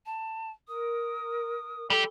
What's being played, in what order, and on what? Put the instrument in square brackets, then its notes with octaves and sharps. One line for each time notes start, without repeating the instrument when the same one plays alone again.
[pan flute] A5
[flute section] A#4 [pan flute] D#6
[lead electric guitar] G3 G4 [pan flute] A4